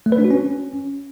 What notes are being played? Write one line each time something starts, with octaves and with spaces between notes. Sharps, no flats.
A3
B4
D4
F#4
C#4